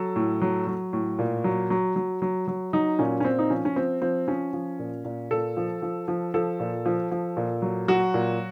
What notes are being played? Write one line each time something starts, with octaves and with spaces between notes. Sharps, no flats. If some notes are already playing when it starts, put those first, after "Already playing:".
Already playing: F#3 A4
A2
F#3
F#3
A2
A#2
F#3
F#3
F#3
F#3
F#3
F#3 D#4
A#2 C#4
C#4
A#2 C4
D#4
F3 C#4
C#4
F3 C4
F3 C4
F3 C#4
F3
A#2
A#2
A#2 A4
F3
F3
F3
F3 A4
A#2
F3
F3
A#2
F#3
F#3 F#4
A#2